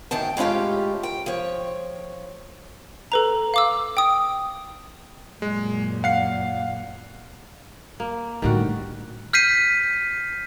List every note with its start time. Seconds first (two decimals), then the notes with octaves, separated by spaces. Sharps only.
0.11 F#2 A2 D#3 G5 A5
0.37 A2 G#3 C#4 F4 G4
1.03 G5
1.26 F3 C#5
3.12 A4 B4 A#5
3.54 F5 D6 E6
3.97 G5 D#6
5.42 F#2 A#2 G#3
6.04 F5 F#5 C7
8.00 A#3
8.42 A2 D3 D#3 G3 F#4
9.33 F6 G6 B6 C7 D#7